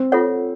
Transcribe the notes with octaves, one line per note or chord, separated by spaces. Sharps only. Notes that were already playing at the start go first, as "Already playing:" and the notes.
Already playing: C4
F4 A4 C#5 F#5